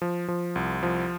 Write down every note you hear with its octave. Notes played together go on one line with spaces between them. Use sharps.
F3
F3
C2
F3